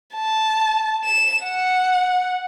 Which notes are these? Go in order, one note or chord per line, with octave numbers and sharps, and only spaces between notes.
A5
E7
F#5